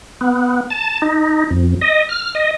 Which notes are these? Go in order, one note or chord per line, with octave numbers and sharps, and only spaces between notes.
B3
A5
D#4
F2
D#5
F6
D#5